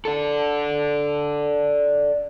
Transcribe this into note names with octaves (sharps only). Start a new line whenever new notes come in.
D4 A4